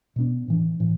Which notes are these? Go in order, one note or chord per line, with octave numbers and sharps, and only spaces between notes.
B2 B3 D4
A2 E3 D4
A2 E3